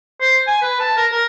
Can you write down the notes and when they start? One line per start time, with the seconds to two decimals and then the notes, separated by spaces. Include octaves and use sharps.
0.21 C5
0.47 G#5
0.62 B4
0.80 A5
0.97 A#4
1.12 A#4